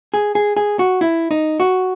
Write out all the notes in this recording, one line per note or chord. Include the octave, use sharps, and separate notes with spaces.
G#4
G#4
G#4
F#4
E4
D#4
F#4